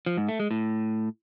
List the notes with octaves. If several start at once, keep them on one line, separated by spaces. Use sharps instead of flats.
F3
G#2
A3
G#3
A2